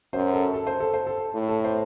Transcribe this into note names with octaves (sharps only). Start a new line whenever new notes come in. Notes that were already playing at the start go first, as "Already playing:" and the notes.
F#2 C5
A4
A4
C5
A4
C5
A4
A2
A4
C5